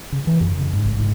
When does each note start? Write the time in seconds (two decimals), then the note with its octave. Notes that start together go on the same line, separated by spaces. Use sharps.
0.12 C#3
0.27 E3
0.41 F#2
0.59 C#3
0.73 G#2
0.85 A1
0.98 G#2